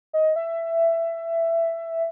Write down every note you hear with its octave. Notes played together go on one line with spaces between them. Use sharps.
D#5
E5